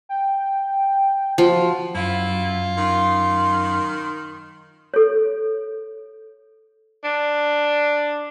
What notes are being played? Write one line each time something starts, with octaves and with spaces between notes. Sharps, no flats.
G5
F3 F#4
F#2 E4 F4
D#3 C6
A4 C#5
D4